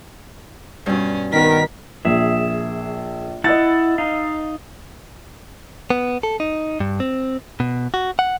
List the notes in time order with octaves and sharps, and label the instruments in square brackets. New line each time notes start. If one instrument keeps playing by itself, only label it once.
[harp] G2 B2 [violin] C#4
[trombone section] D#3 [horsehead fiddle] B3 A#4 [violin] B6
[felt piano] A#1 [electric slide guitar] G#4 E5
[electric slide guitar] E4 F#5 [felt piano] D#5 E6 A6
[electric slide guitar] D#4 F5
[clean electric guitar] B3
A4
D#4
G2
C4
B2
F#4
F#5